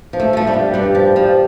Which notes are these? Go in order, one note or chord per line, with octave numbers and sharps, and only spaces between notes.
F3
A3
F3 A3
G3
G2
G2 G3
F3
F3